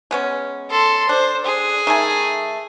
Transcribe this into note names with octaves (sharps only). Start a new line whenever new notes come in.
G#3 B3 C#4
A4 C6
D4 C5
G#4
D#3 A3 G#5